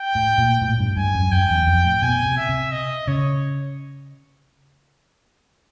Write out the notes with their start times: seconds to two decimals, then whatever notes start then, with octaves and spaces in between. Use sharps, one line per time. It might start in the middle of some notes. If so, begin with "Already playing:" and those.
Already playing: G5
0.15 A2
0.38 A#2
0.62 A2
0.80 G2
0.97 G2 G#5
1.15 F#2
1.32 F#2 G5
1.50 E2
1.67 F2
1.85 A2
2.02 B2 G#5
2.25 C3
2.37 E5
2.49 C3
2.72 D#5
3.07 C#3 C#5